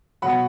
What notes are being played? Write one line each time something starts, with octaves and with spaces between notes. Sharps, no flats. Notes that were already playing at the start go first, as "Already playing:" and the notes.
B2 F#3 F#5 B5